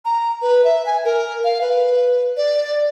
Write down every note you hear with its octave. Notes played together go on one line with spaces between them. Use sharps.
A#5
B4
E5
G#5
A#4
F5
B4
D5